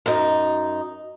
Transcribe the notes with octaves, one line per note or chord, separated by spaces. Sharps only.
F#2 D#4